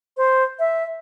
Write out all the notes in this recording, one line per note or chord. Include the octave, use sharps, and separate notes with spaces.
C5
E5